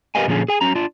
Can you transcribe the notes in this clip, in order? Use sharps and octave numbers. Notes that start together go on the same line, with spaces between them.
G4 A#4 B4 D#5 F5 G#5
A#2 D3 F3 C#4 G#4
G#4 G#5
F#3 C#4 A#5
D4 F4